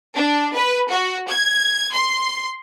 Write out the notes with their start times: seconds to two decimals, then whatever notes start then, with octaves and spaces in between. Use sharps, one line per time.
0.15 D4
0.54 B4
0.89 F#4
1.29 G#6
1.92 C6